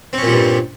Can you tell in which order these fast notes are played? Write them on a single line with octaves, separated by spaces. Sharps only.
C4 C#4 A#2 G3 G2